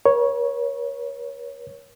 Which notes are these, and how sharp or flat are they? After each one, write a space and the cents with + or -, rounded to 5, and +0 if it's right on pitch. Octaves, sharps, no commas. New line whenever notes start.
A#4 +45 C#5 +0